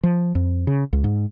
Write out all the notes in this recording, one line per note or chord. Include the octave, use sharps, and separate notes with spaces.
F3
F2
C#3
C#2
G#2